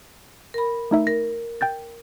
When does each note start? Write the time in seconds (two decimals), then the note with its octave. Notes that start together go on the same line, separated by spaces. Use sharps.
0.54 A#4 B5
0.91 A3 D#4 E5
1.07 A#4 A#6
1.61 G5 G6 A6